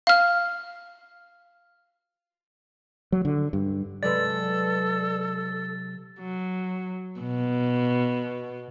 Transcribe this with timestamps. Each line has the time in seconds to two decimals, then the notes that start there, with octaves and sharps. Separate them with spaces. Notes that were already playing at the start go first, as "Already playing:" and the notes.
0.07 F5 F6
3.12 F#3
3.25 D3
3.53 G2
4.03 C3 F#3 G#3 A4 B4 D5 A6
6.20 F#3
7.20 B2